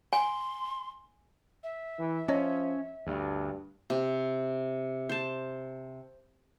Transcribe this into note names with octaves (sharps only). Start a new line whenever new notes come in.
G#5 C6
E5
E3
F3 C#4 C#5 D#5
D2 G2
C3
C5 A5